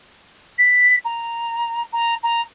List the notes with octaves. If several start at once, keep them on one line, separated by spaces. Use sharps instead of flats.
B6
A#5
A#5
A#5